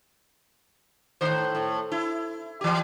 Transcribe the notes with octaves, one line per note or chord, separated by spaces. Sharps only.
A2 D#3 C5
A2
E4
E3 G4